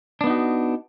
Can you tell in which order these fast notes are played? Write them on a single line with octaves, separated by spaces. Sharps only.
D4 B3 D#4 F#4